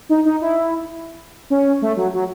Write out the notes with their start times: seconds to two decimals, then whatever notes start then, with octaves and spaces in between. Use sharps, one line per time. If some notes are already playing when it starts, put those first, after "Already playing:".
0.09 D#4
0.25 D#4
0.42 E4
1.50 C#4
1.82 A3
1.97 F#3
2.13 F#3